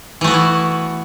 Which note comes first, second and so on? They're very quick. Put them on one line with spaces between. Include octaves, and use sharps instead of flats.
E3 A3 F#4 B3 E4